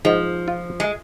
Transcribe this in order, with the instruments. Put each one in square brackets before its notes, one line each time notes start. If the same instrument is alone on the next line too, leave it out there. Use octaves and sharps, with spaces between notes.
[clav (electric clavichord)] G#2 [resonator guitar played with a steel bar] F3
[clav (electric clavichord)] F4
[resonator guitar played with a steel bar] G#3